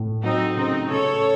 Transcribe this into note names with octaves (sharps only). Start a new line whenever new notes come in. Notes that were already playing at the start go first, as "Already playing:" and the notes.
Already playing: A2
F#3 C4 D#4
C#3 C4 D#4
C#3 A4 C#5